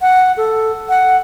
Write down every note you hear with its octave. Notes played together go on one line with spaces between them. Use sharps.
F#5
A4
F#5